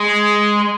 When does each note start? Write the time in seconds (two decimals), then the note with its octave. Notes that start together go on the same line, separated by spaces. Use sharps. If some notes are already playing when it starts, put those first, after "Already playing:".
Already playing: G#3